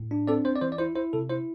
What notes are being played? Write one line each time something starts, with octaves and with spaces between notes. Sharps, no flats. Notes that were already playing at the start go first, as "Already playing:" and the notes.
Already playing: A2
D4
C4 A4 D5
C4 C5
D5
E3 C5
D5
E4 C5
E4 C5
C3 A4
E4 C5